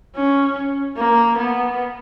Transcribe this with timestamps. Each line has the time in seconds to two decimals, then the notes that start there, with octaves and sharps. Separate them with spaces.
0.15 C#4
0.97 A#3
1.38 B3